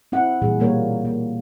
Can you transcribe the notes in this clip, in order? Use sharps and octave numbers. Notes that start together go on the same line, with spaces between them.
C4 E4 F#5
A#2 E3 G3 G#4
B2 G3 A#3 A#4 C#5
A#3